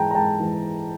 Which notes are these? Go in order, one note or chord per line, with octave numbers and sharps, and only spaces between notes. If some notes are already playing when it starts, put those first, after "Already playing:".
Already playing: G#2 E3 G#3 G5 A5 A#5
A#5
G#2 G5 A5
E3 G#3